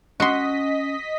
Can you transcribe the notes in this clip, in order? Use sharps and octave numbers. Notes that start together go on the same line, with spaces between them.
C#4 F#4 D#5 C6 B6